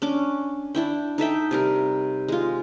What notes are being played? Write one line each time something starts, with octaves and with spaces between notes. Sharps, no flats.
C#4 D4 D6
D4 E4 G5
D#4 A4 E5 G5
C3 G3 A#4
G#3 F4